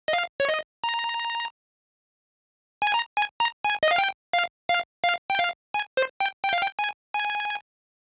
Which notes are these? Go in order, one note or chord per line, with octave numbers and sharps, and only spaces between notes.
D#5
F5
C#5
D#5
A#5
G#5
A#5
G#5
A#5
G#5
D#5
F5
G5
F5
F5
F5
G5
F5
G#5
C5
G5
G5
F5
G5
G#5
G#5